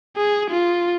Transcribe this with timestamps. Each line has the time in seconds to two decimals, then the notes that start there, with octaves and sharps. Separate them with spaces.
0.17 G#4
0.50 F4